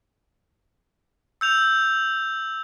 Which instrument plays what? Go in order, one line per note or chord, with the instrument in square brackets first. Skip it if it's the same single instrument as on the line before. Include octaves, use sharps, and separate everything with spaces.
[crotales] E6 G6 F7